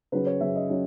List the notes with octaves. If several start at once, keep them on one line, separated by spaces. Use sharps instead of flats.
C#3 F#3 C#4 B4
C#5
C#3 F#3 C#4 E5
D#5
F#3 C#4